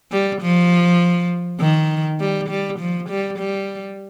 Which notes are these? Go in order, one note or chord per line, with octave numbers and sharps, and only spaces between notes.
G3
F3
D#3
G3
G3
F3
G3
G3